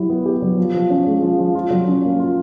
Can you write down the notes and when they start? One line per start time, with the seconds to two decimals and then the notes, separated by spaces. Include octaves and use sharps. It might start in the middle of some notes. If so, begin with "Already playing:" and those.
Already playing: F#3 E4 G4
0.09 B3
0.25 G4
0.42 F#3
0.57 F3
0.74 F3
0.90 C#4
1.07 G#3
1.22 F3
1.39 F3
1.55 F4
1.70 F#3
1.88 C#4
2.04 A#3
2.19 F4